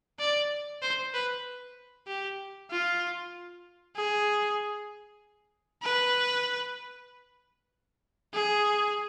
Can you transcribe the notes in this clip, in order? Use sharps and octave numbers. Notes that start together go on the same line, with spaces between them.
D5
C5
B4
G4
F4
G#4
B4
G#4